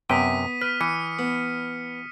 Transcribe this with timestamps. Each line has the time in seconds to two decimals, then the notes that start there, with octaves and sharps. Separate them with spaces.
0.10 F#2 C3 B3 G5 D#6 B6 D#7
0.61 B4 F6
0.81 E3 C#7 D#7
1.19 B3